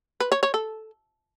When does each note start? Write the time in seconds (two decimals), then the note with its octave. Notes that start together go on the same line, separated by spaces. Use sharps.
0.20 B4
0.32 C#5
0.43 C#5
0.54 A4